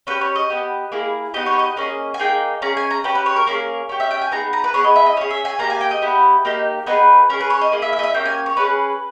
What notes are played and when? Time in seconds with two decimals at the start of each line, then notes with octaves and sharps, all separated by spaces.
0.07 C#4 G4 B4
0.21 C#5
0.36 D#5
0.50 B3 G4
0.92 A#3 E4 G#4
1.34 B3 D#4 G4 D#5
1.46 C#5
1.59 D#5
1.76 A#3 C#4 G#4 D#5
2.14 G#5
2.19 A#3 D#4 G#4 G5
2.62 C#4 G#4 A#5
2.77 G#5
2.91 A#5
3.04 C#4 G4 B4
3.15 B4
3.26 C#5
3.36 A#4
3.47 A#3 C#4 G#4 A#4
3.89 C#4 G4
4.00 E5
4.11 G5
4.21 G#5
4.32 B3 D#4 G#4 A#5
4.53 A#5
4.64 B4
4.74 B3 E4 G#4 C#5
4.84 D#5
4.96 E5
5.06 D#5
5.17 C#4 G#4 C#5
5.30 E5
5.45 G#5
5.59 A#3 D#4 G4 A#5
5.70 G#5
5.81 G5
5.91 D#5
6.02 B3 E4 G4
6.45 A#3 D#4 G4
6.87 B3 D#4 G#4 B4
7.30 C#4 A#4
7.33 G#4
7.41 B4
7.50 C#5
7.61 D#5
7.72 A#3 E4 G#4 D#5
7.82 E5
7.93 E5
7.99 D#5
8.03 E5
8.14 A#3 C#4 G4 G5
8.26 G#5
8.46 C#5
8.57 C#4 G#4 B4